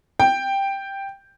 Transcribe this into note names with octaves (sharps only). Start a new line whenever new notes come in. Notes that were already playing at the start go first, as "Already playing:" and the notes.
G5